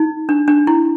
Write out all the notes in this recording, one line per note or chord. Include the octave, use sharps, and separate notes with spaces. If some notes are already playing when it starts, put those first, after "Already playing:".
Already playing: D#4
D4
D4
E4